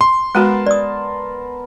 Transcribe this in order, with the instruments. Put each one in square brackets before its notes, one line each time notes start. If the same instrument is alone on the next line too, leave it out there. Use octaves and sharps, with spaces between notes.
[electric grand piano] C6
[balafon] G#3 F#4 [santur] B3 A#4 A5
[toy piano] D5 D#6